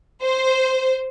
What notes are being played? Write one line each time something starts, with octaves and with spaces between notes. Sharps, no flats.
C5